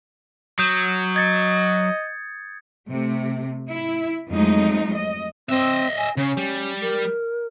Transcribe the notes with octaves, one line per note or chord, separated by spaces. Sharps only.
F#3 D#6 G6
D#5 G#6 A6 C#7
C3 A3
E4
F2 F3 F#3 G#3 A3 D#4
D#5
C4 D#5 E5
G#5
C#3 C#4
G3
A#4